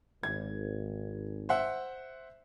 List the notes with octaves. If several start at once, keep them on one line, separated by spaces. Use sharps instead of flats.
G#1 G#6
C5 E5 F#5